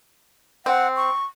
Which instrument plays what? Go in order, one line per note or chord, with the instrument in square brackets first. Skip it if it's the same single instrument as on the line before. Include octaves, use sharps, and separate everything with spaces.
[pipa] C4 [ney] F#5
[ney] C#6